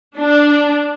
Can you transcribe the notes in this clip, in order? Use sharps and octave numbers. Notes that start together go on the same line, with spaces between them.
D4